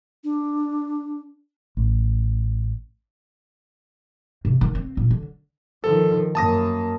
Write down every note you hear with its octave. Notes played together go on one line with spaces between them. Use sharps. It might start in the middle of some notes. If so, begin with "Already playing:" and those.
D4
A1
C3
D#3
C4
A#2
D3
D#3 F3 A4
F#2 A#3 A5 D#6 A#6